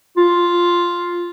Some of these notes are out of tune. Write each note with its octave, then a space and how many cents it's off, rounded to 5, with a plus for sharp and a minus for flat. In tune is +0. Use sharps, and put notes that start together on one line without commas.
F4 +0